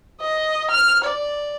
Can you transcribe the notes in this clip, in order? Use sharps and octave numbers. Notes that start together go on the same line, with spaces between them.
D#5
F6
D5